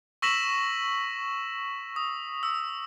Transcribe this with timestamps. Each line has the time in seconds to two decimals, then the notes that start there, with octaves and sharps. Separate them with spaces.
0.22 C#6 E6 A#6 B6 E7 F#7
1.96 D#6
2.43 E6